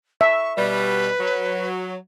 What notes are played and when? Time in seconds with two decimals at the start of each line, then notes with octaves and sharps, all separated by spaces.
0.21 E5 C#6
0.57 B2 G3 B4
1.20 F#3